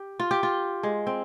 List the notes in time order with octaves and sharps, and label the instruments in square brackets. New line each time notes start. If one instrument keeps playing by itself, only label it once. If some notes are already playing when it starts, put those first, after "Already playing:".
Already playing: [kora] G4
F4
G4
F4
G#3
C4